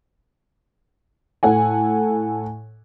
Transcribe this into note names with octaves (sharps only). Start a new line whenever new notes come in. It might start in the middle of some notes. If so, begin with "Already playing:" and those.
A2 A4 F#5 G#5